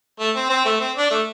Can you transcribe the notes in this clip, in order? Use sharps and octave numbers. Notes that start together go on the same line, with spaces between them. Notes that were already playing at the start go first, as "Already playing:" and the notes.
A3
C4
C4
A3
C4
D4
A3